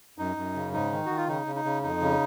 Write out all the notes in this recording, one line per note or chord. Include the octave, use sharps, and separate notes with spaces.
F#2 D#4
F#2
C#3
G#2 D#4
D#3
D#3 F#4
F4
C#3 D#4
C#3
D#4
C#3
F2 D#4
C#3